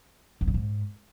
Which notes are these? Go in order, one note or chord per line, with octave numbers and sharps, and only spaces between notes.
F#2
B2
G#2